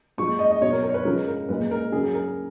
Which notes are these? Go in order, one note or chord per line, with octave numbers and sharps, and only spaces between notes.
A#2 F3 G#3 C#6
D#5
D#5
B2 F#3 C#5
A#4
A#4
C#5
B4
C#3 F3 G#3 A#4
A#4
A#2 G#3 B4
A#4
C#3 F#3 G#4
A#4